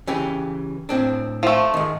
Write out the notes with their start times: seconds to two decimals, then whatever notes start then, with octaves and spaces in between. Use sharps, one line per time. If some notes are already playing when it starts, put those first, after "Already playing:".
0.07 C#3 E3 G4
0.89 A2 C4 D4
1.43 F3 A3
1.74 G#2 D#3